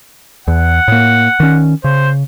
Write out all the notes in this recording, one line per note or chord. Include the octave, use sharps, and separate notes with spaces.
E2 F#5
A2 A#3
D#3 C#4
C#3 C5